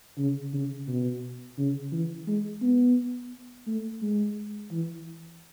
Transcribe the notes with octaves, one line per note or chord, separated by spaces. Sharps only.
C#3
C#3
B2
C#3
E3
G#3
B3
A3
G#3
E3